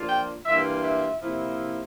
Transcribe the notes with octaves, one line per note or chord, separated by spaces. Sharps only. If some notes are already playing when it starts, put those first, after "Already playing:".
Already playing: F3 A#3 D4 F4
G5
G2 E3 A#3 F4 E5
E5
C3 F3 A#3 E4